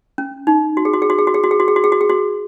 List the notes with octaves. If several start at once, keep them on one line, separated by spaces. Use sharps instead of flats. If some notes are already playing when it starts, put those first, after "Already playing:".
C#4
D#4
F#4
G#4
F#4
G#4
F#4
G#4
F#4
G#4
F#4
G#4
F#4
G#4
F#4
G#4
F#4
G#4
F#4